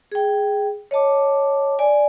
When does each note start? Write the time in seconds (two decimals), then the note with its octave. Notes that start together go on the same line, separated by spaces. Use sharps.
0.12 G#4 G5
0.91 C#5 D#5 A5 D6
1.79 D5 G#5